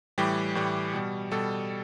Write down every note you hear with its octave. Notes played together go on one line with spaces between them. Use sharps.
A2 E3 G3 G4
A2 E3 G3
B2 G3
B2 G3 A4